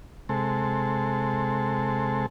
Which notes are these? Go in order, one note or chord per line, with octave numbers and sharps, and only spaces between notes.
C3 G#3 A4